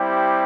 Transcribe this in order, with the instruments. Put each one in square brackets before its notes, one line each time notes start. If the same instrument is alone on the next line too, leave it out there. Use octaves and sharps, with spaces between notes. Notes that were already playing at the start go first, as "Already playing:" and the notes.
Already playing: [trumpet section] G3 C4 E4 G4